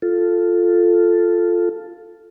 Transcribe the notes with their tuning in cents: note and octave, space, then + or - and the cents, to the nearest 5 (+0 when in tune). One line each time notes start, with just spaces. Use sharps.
F4 +0 A4 +0